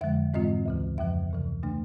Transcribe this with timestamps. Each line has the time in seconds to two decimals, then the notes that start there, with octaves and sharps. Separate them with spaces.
0.01 F2 D3 F3 G#3 E5
0.34 G#2 E3 G#3 C4 F4 D#5
0.66 D2 C#3 E3
0.98 F2 C#3 F3 E5
1.30 D2 C3 E3
1.63 C#3 E3 A3 D4